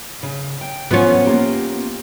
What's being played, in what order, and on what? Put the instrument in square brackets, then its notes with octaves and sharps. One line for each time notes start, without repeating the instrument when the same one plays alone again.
[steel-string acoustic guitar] C#3
G5
[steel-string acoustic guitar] E3 F3 F4 [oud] B3 C#4
[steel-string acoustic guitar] A#3 F4 G4